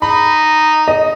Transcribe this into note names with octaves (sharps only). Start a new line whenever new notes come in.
D#4 B5
D#5